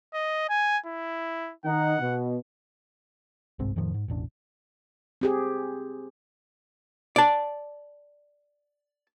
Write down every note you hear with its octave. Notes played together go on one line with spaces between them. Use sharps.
D#5
G#5
E4
D#3 D#4 F#5
B2
G1 C2 G#2 C4
F2 A2 D#3 F3
G#2
E1 A1 D4
C4 G4 G#4
D5 A5